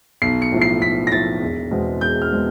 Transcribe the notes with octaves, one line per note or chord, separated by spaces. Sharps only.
B1 C7
C#7
A2 F3
C7
B1 B6
A#6
A2 F3 A6
E1
E2 B2 G#3 C4
E1 G6
F6
B2 G#3 C4